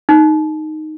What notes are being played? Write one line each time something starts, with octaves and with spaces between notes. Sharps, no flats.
D#4